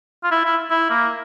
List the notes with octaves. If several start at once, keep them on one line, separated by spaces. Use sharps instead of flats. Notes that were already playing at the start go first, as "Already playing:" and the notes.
F4
E4
E4
E4
A#3